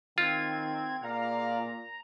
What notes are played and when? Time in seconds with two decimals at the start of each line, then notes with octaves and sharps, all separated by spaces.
0.18 D#3 C4 F4 G#6
1.03 A#2 G#4 D5 F5 A#5